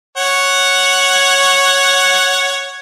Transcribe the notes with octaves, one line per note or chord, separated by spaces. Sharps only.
C#5 F#5